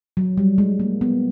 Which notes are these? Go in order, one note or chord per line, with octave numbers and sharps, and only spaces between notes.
F#3
G3
G#3
A#3
B3